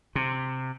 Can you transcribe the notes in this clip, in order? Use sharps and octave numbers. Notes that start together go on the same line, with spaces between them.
C3